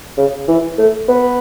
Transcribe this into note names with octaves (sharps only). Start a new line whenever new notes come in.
C#3
E3
A3
B3